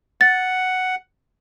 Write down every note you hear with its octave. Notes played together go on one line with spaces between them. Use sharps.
F#5 A6